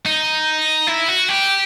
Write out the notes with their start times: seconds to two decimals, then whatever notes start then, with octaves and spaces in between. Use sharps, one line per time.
0.06 D#4
0.87 E4
1.08 F#4
1.29 G4